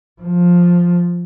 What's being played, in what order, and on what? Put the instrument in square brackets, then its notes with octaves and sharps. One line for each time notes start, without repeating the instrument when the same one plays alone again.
[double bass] F3